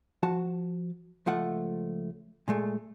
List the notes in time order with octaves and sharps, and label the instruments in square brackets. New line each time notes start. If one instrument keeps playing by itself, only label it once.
[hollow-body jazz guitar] F3 F#4 A5
C#2 F3 A3 F#5
A#2 G#3 A3